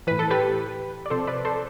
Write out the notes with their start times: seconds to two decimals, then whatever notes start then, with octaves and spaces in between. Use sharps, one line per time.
0.07 A2 E3 B4
0.19 A4
0.30 G4 B4
1.06 D5
1.10 C3 F3 A4 C5
1.27 B4 D5
1.45 A4 C5